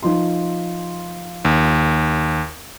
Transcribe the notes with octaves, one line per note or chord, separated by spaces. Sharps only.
F3 D#4 C6
D#2